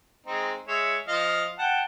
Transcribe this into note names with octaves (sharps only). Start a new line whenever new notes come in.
G#3 C4 D#4
G#3 C#5 E5
F3 D#5 F5
F#5 G5 A5